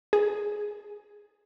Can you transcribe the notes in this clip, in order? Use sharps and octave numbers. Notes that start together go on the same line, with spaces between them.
G#4